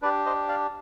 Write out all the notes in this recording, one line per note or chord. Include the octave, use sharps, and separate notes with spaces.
D4 G4 B4 D5
C5 D#5
D5 F5